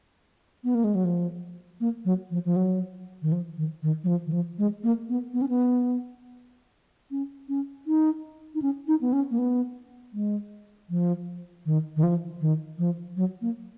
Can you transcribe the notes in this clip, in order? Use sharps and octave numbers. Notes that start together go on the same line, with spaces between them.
B3
A#3
G#3
F#3
F3
A#3
F#3
F3
F3
F#3
D#3
F3
D#3
D#3
F#3
F3
D#3
F3
G#3
A#3
B3
B3
C#4
B3
C#4
C#4
D#4
D#4
C#4
D#4
B3
C#4
A#3
B3
G#3
F3
D#3
D#3
F3
D#3
F3
F#3
A#3